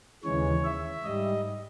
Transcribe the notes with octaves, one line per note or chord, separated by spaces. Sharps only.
D#2 C#3 E3 G#3 C#5
E5
G#2 G3 D#5